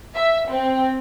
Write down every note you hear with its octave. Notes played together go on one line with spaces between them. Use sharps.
E5
C4